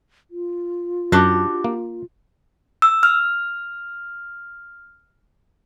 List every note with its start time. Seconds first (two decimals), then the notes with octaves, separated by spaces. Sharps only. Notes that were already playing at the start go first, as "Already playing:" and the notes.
0.31 F4
1.12 F#2 D4 F#4 G4
1.64 A#3
2.82 E6
3.03 F6